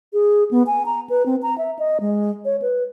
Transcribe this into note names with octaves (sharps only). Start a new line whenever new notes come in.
G#4
B3
G#5
A#5
B4
C4
A#5
E5
D#5
G#3
C#5
B4